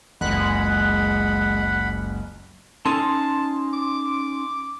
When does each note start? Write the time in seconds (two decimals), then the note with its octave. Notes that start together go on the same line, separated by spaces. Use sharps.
0.21 F#1 C#2 G#3 F#5 B5 F#6
2.86 C#4 D#4 G#5 A5 C6
3.73 D6